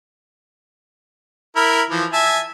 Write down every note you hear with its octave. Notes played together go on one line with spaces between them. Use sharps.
E4 A#4 B5
E3 F3
E5 G#5 A5